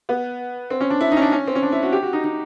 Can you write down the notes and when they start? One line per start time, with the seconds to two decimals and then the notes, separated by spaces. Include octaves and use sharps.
0.09 B3
0.70 C4
0.80 C#4
0.90 D4
1.01 E4
1.12 D#4
1.17 C#4
1.22 D4
1.32 C#4
1.47 C4
1.55 C#4
1.63 D4
1.72 E4
1.82 F#4
1.92 G4
2.03 F#4
2.13 D#4
2.24 D#4